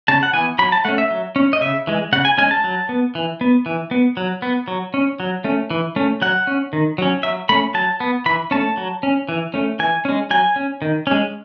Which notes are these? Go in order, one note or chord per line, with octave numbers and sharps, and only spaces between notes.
C#3 A5
F#5
E3 B3 G#5
F#3 B5
A5
A3 C#4 F#5
E5
F#3
C#4
D#5
C#3 E5
E3 G#3
C#3 F#5
G#5
G#3 C#4 G#5
A5
F#3
B3
E3
B3
E3
B3
F#3
B3
F#3
C#4
F#3
A3 C#4
E3
A3 C#4
F#3 F#5
C#4
D#3
F#3 C#4
F#3 E5
A3 C#4 B5
F#3 A5
B3
E3 B5
A3 C#4 A5
F#3
C#4
E3
A3 C#4
E3 G#5
G#3 C#4
F#3 G#5
C#4
D#3
G#3 C#4